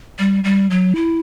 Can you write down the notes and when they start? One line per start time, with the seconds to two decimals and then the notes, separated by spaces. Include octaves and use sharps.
0.19 G3
0.44 G3
0.70 F#3
0.96 E4